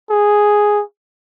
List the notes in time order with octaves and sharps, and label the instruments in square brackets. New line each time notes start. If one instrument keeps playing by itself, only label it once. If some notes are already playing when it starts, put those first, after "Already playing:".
[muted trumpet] G#4